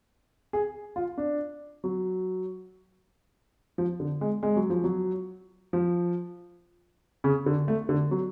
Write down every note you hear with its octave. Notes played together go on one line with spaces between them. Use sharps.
G#4
F4
D4
F#3
F3
D3
G#3
G#3
F#3
F3
F#3
F3
C#3
D3
A3
D3
F#3